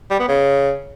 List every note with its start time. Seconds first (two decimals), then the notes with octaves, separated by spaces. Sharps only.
0.11 G3
0.20 B3
0.28 C#3